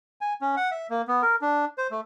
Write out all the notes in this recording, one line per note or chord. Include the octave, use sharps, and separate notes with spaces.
G#5
C#4
F#5
E5
A#3
B3
A#4
D4
C5
A3